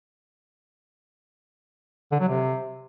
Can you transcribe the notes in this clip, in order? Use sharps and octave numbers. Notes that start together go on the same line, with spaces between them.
D3
F#3
C3